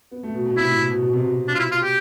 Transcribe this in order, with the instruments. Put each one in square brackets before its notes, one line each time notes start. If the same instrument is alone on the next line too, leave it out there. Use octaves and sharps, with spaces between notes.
[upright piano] B3
A3
B2
B2
[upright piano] C3 [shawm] E4
[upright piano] A2
B2
B2
B2
C3
B2
[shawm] D4
F4
E4
F4
G4